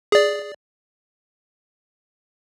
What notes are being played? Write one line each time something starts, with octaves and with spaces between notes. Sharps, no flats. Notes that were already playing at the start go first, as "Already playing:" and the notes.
G#4 D5